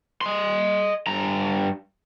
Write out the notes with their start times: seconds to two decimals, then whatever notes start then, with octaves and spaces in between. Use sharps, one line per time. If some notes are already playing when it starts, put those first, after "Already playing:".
0.21 D#5 C6
1.07 G2 A#5